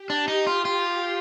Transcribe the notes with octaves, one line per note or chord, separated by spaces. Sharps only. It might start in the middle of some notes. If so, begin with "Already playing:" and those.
Already playing: G4
D4
D#4
F4
F4